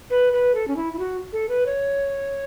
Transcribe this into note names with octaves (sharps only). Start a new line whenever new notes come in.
B4
B4
A4
C#4
E4
E4
F#4
A4
B4
C#5